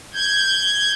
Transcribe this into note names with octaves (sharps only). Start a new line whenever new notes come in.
G6 G#6